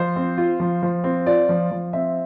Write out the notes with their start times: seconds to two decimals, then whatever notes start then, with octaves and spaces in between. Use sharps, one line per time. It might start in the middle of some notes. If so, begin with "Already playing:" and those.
Already playing: F3 C5
0.16 C4
0.38 F4
0.60 F3
0.83 F3
1.04 C4
1.26 F4 D5
1.49 F3
1.71 F3
1.93 C4 E5